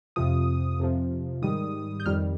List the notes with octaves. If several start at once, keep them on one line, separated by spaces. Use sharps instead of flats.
F2 C3 F3 D#6
F2 C3 F3
G#2 D#3 G3 D#6
G6
F2 D#3 G3 F6